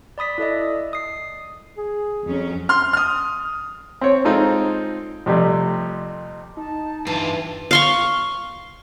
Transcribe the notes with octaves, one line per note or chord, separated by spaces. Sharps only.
D5 B5 D#6 B6
E4 A4 D5 D#5
D#6 C7
G#4
F2 F#3 C#4
C6 F6
D#6 F6
C4 C#5
G#3 C4 D#4 F4 G#4 A4
F2 C3 G3 A3
D#4 A5
G2 E3 F4
F5 C6 C#6